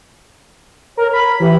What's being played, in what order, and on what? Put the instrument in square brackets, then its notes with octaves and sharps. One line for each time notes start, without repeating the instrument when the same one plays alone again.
[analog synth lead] A#4 [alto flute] C#5
[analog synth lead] B5
[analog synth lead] E3 [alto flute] G4